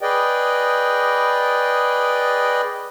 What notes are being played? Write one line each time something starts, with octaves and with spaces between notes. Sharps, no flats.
G#4 B4 D5 D#5 G5